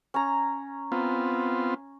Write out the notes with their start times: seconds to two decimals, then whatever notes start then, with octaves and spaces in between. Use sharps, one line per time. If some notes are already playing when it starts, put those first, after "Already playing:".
0.14 C#4 A#5
0.92 B3 C4 F4